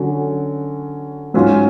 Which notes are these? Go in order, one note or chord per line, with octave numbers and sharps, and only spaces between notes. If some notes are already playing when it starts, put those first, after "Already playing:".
Already playing: D3 F#3 C#4
G#2 F#3 C#4 F4